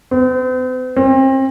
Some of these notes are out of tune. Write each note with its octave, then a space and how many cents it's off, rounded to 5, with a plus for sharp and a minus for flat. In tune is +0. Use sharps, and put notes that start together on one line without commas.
C4 -45
C4 +35